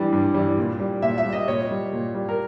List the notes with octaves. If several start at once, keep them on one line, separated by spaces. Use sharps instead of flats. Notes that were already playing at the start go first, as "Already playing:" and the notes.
Already playing: G2 E3 G3
G2
E3 G3
A#2
G3
A#2 E5
E5
G3
D#5
A#2 C#5
G3
A#2
G3
A#4